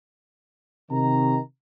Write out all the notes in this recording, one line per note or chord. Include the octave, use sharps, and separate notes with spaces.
C3 D#3 A#5